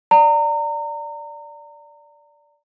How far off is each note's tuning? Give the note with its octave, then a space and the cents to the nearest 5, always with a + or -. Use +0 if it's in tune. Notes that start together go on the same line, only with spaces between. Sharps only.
D5 -5 A#5 -30